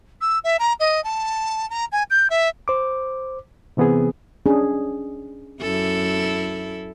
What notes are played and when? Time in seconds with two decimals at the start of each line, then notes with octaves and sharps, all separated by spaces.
0.21 E6
0.44 E5
0.59 A#5
0.80 D#5
1.04 A5
1.70 A#5
1.92 G#5
2.10 G6
2.30 E5
2.68 C5 D6
3.77 C3 E3 B3 C4 G#4
4.46 C#4 D4 G#4
5.61 F#2 E4 A4